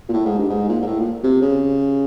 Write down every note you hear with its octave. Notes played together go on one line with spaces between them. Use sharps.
A#2
A2
G#2
G2
G#2
A#2
G#2
A2
A#2
C3
C#3